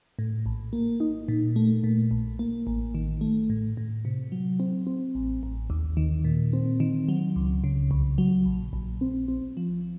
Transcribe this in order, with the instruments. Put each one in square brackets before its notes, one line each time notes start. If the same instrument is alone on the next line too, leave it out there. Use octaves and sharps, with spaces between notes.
[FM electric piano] A2
A#1
A#3
D#4
A#2
A3
A#2
A#1
A#3
A1
D#3
A3
A2
A2
C3
F#3
C4
C4
A1
A1
D#2
D#3
A#2
C4
D#3
F#3
C#2
C#3
C2
F#3
A#1
A#1
C4
C4
F3